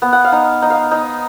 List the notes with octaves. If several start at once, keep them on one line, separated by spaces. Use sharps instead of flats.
B3
F#5
F5
D#4
D#4
F5
D#4